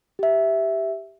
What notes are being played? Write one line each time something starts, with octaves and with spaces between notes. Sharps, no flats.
G4 E5